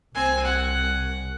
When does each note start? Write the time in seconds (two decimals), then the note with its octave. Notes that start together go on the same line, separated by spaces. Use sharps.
0.15 C2 C4 G#5
0.45 F#5